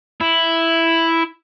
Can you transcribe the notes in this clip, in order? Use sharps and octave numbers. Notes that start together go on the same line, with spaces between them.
E4